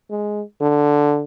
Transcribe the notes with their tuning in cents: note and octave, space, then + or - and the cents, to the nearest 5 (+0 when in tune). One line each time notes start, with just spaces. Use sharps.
G#3 +5
D3 +0